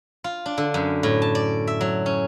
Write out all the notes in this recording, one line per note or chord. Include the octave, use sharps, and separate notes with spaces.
F4
D4
D3
F#2
A2
A5
D5
E5
F#3
C#4